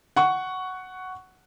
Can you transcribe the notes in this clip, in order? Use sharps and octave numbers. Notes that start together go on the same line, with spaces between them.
F#5 C#6